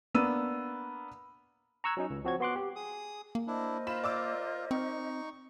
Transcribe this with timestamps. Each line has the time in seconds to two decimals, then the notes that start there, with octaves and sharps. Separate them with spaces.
0.14 A#3 B3 D4 E6 D#7
1.84 A#5 C#6 E6 F#6 G#6
1.97 F#3 C#4 D#4
2.10 C#2
2.24 F3 C4 F#4 C#5 G#6
2.40 B3 F#4 C6 D6 F#6
2.56 G4
2.76 G#4 D#6
3.35 A#3
3.47 D4 E4 A#4 C5 D#5
3.87 F4 B5 E7
4.04 D5 D6 E6
4.71 C4 D#4 C#6